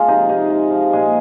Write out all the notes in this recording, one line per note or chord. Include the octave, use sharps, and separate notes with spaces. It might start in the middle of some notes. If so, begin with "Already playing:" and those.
Already playing: F3 G#3 F4 G#4
C3 D#4
C3 D#4
G#3
F3
A#2 G#3 G#4